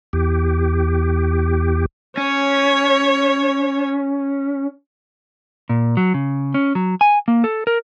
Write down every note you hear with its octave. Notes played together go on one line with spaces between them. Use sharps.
E2 G4
C#4 C#5
A#2
F#3
C#3
C#4
F#3
G#5
A#3
A4
A#4